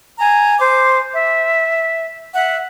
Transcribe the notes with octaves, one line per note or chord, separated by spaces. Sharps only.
G#5 A#5
C5 D6
E5
E5 F#5